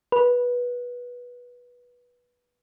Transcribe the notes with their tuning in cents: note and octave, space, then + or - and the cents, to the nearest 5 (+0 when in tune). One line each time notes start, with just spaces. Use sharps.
B4 -15